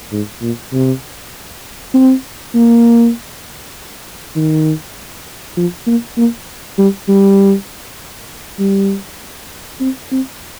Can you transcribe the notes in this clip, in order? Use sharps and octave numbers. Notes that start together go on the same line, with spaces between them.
G#2
A#2
C3
C4
A#3
D#3
F3
A#3
A#3
G3
G3
G3
C4
C4